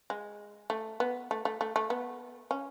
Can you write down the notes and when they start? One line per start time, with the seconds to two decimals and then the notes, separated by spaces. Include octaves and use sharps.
0.10 G#3
0.70 A3
1.00 B3
1.31 A3
1.45 A3
1.61 A3
1.76 A3
1.90 B3
2.51 C#4